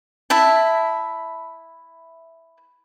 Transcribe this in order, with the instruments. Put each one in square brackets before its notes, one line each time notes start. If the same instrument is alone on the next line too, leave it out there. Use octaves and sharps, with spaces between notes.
[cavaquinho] E4 E5 A5